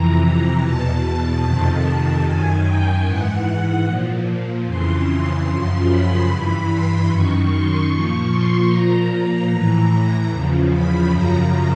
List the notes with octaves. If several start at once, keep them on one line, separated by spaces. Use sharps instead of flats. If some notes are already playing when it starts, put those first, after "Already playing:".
Already playing: F2 C3 E3 A#5
A#5
E2 B2 A5
F2 C3 D#3
F#2 D#3 G#5
G5
G#2 E3 F#5
F#5
A#2 F3
F2 C#3 E3 C6
C6
F#2 C#3 F3 C6
B5
G2 E3 B5
C6
F#2 D#3 C#6
C6
A#2 F3 C#6
C6
A#2 F3 A#5
A2 E3
E2 C#3 F3
B5
F#2 C#3 F3 A#5